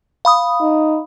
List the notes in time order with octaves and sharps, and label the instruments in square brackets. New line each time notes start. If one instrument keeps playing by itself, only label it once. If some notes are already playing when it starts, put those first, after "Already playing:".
[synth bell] F5 B5 D#6
[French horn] D#4